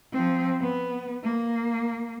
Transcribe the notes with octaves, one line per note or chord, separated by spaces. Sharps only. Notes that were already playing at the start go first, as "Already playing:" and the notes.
F3 C4
B3
A#3